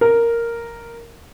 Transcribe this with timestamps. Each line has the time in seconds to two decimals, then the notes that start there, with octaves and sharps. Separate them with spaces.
0.01 A#4